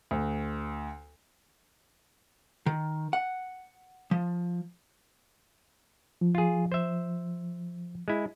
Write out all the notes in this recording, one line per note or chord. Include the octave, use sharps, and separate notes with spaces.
D2
D#3
F#5
F3
F3
F4 G#4
C5 E5
G#3 E4